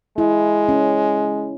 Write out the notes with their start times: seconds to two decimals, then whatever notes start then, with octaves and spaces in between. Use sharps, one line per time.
0.18 G#3 E4
0.69 C#4